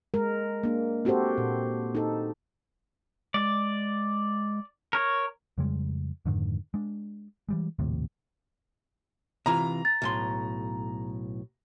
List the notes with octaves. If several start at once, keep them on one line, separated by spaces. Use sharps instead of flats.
G#3 A#4
A#3 D4
C4 F#4 G4 A4 C5
A#2
D#4 A4
G#3 D5
A#4 C#5
F2 C#3 G3 G#3
F2 G#2 D3 D#3
G#3 D4
E3 G3 G#3
A#1 D#2 A2 C3
C3 E3 F4 A#5
A6
B1 A2 C6